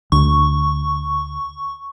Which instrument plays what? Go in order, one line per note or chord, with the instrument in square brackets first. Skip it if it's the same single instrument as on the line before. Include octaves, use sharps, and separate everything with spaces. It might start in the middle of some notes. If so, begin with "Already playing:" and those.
[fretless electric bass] D2 [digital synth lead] C#6